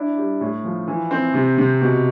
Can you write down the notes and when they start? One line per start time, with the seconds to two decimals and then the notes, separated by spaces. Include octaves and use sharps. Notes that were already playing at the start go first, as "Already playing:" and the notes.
Already playing: D4 E4
0.18 G3
0.41 A2
0.64 F3
0.88 E3
1.11 C4
1.34 C3
1.58 C3
1.81 B2